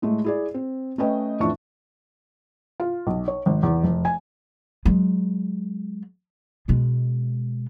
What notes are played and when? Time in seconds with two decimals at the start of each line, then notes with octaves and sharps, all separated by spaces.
0.02 A2 G#3 A3
0.24 E4 G#4 D5
0.54 C4
0.98 A3 C#4 B4 D#5 G5
1.40 F2 A2 E3 D4 E5 C#6
2.80 F4
3.07 B1
3.28 C#5
3.46 G#1
3.63 E2
3.83 F1
4.05 G#5
4.86 F#3 G#3
6.68 B2 G#3